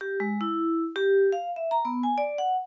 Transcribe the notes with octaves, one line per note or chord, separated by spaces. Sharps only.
G4
G#3
E4
G4
F5
E5
A#5
B3
G#5
D5
F#5